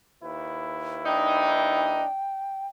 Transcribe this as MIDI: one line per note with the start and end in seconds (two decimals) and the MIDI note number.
0.23 2.05 39
0.23 2.05 64
0.23 2.05 71
1.06 2.04 62
1.06 2.04 63
1.06 2.67 79